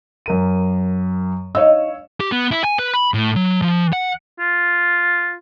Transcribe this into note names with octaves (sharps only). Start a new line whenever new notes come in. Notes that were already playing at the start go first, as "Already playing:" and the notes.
F#2 A#4 D#7
D#4 C#5 F5 E6
G4
B3
E4
G#5
B4
B5
A2
F#3
F3
F#5
F4